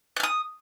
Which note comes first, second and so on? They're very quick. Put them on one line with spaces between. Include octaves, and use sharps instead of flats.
F#6 F6 D#6